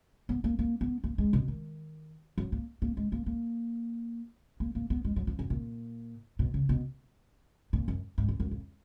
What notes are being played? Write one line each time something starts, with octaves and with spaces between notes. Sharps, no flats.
B3
A#3
A#3
B3
A#3
G#3
B2
D#3
F#3
A#3
A#3
G#3
A#3
A#3
A#3
A#3
B3
G#3
F#3
F3
F#2
A#2
B2
C#3
B2
A#2
F#2
G#2
F#2
F#2
F2